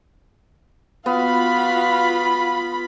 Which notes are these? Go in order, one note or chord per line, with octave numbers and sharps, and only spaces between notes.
B3 F4 F#4 F5 B5